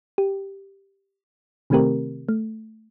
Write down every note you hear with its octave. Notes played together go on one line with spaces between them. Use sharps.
G4
C3 D#3 A3 C4 G4 A#4
A3